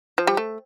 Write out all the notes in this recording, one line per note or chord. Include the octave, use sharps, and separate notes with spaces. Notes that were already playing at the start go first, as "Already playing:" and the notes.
F3
G3
A3